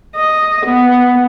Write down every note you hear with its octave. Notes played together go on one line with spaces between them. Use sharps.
D#5
B3